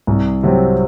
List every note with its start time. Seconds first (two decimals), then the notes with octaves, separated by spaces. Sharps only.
0.07 C2
0.43 C3 F#3 C4